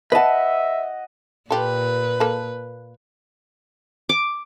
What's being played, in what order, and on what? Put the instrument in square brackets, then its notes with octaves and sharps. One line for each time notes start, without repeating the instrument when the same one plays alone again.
[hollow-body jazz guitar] B4 A5 [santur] D#5 F#5 [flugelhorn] E5
[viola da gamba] A#2 B4 [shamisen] F4 G4 A4
[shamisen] A#3 A4
[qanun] D6